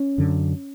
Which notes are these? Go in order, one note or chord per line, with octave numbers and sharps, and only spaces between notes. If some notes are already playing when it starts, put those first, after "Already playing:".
Already playing: C#4
F#2 D3